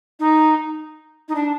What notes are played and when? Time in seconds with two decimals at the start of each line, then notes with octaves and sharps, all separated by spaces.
0.19 D#4
1.28 D#4
1.35 D4